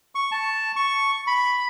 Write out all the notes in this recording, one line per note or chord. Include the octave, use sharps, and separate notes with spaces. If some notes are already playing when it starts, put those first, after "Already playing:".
C#6
A5
C#6
B5